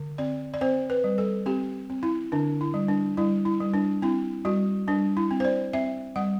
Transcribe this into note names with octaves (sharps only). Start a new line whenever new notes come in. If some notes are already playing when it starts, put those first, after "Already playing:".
Already playing: D3
C4 D5
D5
C4 C5
B4
G3
A4
C4 G4
C4
E4
D3 D4
E4
G3
D4
G3 E4
E4
G3
D4
C4 E4
G3 F#4
G3 D4
E4
C4
C5
D5
C4 E5
G3 F#5